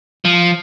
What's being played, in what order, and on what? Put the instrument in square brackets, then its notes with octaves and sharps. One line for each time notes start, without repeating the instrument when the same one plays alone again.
[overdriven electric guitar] F3